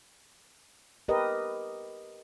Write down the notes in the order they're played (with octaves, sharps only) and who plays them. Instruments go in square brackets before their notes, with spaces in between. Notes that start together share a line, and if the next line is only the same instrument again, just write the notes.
[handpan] G4 A#4 B4 D#5